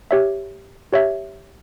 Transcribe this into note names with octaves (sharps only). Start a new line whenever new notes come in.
G4 C#5 E5
G4 C#5 E5